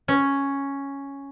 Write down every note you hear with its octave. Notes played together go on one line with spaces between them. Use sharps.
C#4